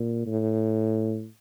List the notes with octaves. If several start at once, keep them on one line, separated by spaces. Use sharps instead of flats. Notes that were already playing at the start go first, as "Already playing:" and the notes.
Already playing: A#2
A2